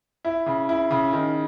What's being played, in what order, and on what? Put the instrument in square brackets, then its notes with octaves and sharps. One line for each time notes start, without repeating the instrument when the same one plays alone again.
[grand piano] E4
C#3
E4
C#3
D#3